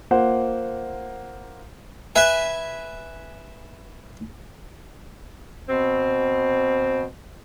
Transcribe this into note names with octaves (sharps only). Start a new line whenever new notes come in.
A#3 F4 C5 F#5
B4 E5 G#5
B2 C4